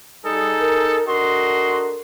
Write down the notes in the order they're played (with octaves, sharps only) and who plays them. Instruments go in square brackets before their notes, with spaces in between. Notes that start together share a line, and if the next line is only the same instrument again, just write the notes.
[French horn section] G3 [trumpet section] D#4 G#4 A4
[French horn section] A#4
[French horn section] D4 A4 A#4 [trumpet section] F#4 D#5 C6